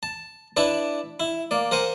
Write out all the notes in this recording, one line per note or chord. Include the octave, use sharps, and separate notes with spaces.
A5
D4 E4 B4 D5
E4
A#3 D5
A#4 C5 F#5 G#5